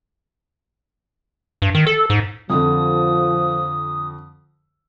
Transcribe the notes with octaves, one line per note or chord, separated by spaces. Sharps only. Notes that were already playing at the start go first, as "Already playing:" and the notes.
G2
D#3
A4
G#2
F2 D3 F3 D#6